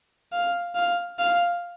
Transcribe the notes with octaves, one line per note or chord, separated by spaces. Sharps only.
F5
F5
F5